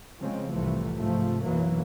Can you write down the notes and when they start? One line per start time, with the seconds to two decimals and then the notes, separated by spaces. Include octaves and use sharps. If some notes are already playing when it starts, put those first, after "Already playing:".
0.20 C#3 F3 G#3 C4
0.52 C2 A2 C3 E3 F3 A3
0.98 G#2 C3 F3 A3
1.44 B1 F#2 E3 F#3 A#3